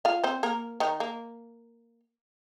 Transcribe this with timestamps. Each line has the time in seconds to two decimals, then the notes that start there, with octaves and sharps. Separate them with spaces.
0.05 F4 F5
0.24 C4 C5
0.43 A#3 A#4
0.80 D#3 D#4
1.00 A#3